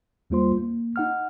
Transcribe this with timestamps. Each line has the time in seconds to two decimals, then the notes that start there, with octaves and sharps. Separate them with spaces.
0.30 E2 G3 A#3 F4 C5 C6
0.58 A#3
0.96 D#4 F#5 F6